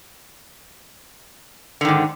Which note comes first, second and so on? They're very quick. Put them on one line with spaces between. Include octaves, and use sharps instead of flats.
D3 D#3 G#2